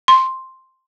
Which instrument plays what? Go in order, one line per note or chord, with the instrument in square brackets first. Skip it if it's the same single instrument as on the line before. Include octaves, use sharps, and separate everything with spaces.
[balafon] C6